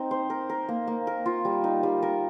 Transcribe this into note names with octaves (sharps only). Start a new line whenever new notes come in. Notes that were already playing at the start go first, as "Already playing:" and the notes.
Already playing: C4 D#4
C5
A#4
A#4
A#3
A#3
A#4
F4
G3
D#4
G3
A#4